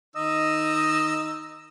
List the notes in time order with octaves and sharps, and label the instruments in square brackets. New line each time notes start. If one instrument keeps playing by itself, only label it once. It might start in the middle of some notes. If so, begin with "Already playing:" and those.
[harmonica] D#3 D#4 E6 [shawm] D#5